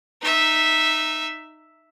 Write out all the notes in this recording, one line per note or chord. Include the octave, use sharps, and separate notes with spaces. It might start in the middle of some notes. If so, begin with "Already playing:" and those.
D#4 E5